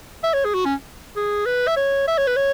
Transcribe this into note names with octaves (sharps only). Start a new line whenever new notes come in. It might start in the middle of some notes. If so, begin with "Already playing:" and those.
E5
C#5
G#4
F#4
C#4
G#4
B4
E5
C#5
E5
C#5
B4
C#5